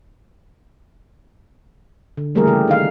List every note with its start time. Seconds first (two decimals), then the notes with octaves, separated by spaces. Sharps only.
2.17 D3
2.35 E3 G3 A3 A#3 G#4 A#4
2.47 C#3 G4
2.68 D#3 D#4 F5